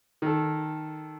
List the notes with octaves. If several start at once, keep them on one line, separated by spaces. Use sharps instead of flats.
D#3 A4